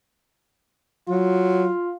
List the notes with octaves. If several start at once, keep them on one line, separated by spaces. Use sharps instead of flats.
F#3 F4